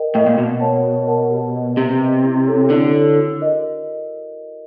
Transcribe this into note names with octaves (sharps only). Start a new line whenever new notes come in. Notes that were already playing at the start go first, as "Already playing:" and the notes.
Already playing: A#4 D#5 G5
A2 D#5 G5
A#2
B2 F#4
A#4 C#5 F#5 A5
F#4
A#4 C#5 F#5 A5
G4
B4 D#5
C3 G4
B4 D#5
E4
A4 C#5
D3 E4
A4 C#5
F#4
A#4 D#5